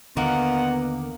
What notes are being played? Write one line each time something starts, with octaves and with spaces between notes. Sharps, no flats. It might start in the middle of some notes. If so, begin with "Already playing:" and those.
D#2 D3 A#3 B3 F4 D#5 F#5